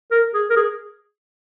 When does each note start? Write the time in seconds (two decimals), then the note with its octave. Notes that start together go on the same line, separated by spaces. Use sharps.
0.11 A#4
0.34 G#4
0.50 A#4
0.56 G#4